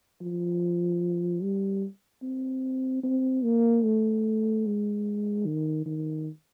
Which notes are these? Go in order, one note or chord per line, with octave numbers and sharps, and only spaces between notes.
F3
G3
C4
C4
A#3
A3
G#3
D#3
D#3